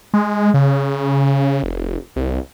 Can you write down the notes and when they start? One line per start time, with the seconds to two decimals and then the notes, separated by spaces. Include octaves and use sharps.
0.14 G#3
0.54 C#3
1.63 F1
2.16 C2